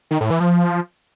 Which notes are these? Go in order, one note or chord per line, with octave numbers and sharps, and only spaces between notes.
D#3
A2
E3
F3